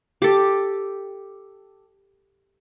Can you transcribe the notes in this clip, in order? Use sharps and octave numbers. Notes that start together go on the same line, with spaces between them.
G4 A4